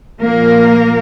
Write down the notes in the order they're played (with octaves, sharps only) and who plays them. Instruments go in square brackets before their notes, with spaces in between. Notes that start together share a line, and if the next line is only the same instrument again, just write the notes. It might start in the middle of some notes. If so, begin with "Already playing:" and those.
[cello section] A#2 F3 A#3 A#4